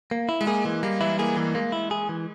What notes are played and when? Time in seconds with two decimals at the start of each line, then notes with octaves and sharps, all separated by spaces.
0.11 A#3
0.29 E4
0.41 G#3
0.47 A#3 G#4
0.65 E3 G#3
0.83 G3 A#3
1.01 E3 E4
1.19 A#3 G#4
1.37 E3 A#3
1.55 G#3 A#3
1.72 E4
1.91 G#4
2.09 E3